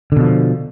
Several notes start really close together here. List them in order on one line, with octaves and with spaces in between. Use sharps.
D3 B2 F3